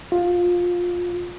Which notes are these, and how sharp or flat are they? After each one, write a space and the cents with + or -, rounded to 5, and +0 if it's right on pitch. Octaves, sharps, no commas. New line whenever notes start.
F4 +15